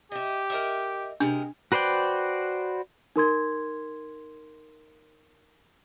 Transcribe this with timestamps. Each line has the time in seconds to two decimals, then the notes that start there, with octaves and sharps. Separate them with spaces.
0.12 G4 D#5 E5
0.50 A#4 D#5 E5
1.20 C3 G#3 D4 A#4
1.72 F#4 B4 C5 D5 G5
3.16 D#4 A#4 C6 G#6